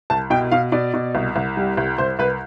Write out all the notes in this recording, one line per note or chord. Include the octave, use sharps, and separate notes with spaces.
C2 A5
B2 G5
B2 F5
B2 D5
B2
C2
C2
G3
C2
C2 C5
C2 B4